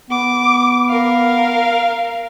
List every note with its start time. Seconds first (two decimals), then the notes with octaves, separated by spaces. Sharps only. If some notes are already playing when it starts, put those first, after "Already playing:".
0.11 B3 D6
0.89 A#4 F5